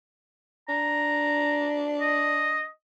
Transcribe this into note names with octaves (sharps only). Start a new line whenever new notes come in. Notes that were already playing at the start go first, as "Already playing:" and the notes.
D4 A#5
D#5